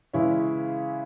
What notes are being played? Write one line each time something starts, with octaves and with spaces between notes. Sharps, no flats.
C#3 E3 G#3 C#4 E4